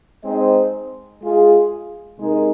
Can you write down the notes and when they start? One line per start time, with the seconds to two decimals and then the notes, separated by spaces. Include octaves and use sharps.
0.24 G#3 C4 D#4 C5 D#5
1.22 G#3 F4 G#4
2.19 C3 G#3 D#4 A#4